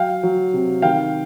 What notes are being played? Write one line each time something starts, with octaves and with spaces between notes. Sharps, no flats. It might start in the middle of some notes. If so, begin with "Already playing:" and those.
Already playing: F#3 F5 G5
F#3
C3
D#3 F5 G5